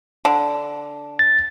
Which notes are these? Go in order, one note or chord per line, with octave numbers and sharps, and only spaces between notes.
D3
A6